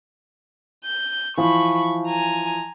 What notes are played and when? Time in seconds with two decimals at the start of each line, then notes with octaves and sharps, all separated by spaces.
0.85 G6
1.37 E3 F3 B5 C#6
2.07 G#5 A#5